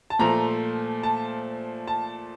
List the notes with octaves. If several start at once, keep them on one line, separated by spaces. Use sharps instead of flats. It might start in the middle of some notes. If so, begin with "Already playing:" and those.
A5
A#2 F3 A3 A#5
A5
A5